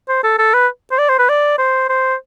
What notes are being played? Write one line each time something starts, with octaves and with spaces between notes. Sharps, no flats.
C5
A4
A4
B4
C5
D5
C5
B4
D5
C5
C5